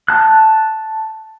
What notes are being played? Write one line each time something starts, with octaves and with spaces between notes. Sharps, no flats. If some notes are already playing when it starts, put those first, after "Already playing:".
A5 F#6